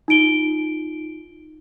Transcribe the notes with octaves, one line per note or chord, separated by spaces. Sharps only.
D#4 F4 D7 G7